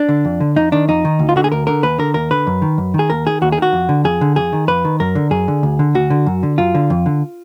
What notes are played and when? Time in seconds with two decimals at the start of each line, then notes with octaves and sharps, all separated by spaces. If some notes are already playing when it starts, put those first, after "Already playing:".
Already playing: D4
0.09 D3
0.25 F2
0.40 D3
0.56 F2 D#4
0.72 D#3 D4
0.88 F2 D#4
1.05 D#3
1.19 D2
1.29 F4
1.36 D3 F#4
1.44 G#4
1.52 D2 A#4
1.67 D3 A#4
1.83 D#2 B4
1.98 D3 A#4
2.14 D#2 A#4
2.31 D3 B4
2.47 F#2
2.62 D#3
2.78 F#2
2.94 D#3
2.99 G#4
3.10 D#2 A#4
3.26 D#3 G#4
3.42 D#2 F#4
3.52 G#4
3.57 D#3 F#4
3.73 F2
3.89 D3
4.04 F2 G#4
4.21 D3
4.36 F2 G#4
4.53 D#3
4.68 F2 B4
4.85 D#3
5.00 F#2 A#4
5.15 D3
5.31 F#2 G#4
5.48 D3
5.63 D2
5.79 D3
5.95 D2 F#4
6.10 D3
6.26 F#2
6.43 D3
6.58 F#2 F4
6.75 D3
6.90 F2
7.06 D3